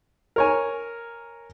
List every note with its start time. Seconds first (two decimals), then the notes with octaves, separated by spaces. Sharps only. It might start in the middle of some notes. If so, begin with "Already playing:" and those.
0.36 A#4 C#5 G#5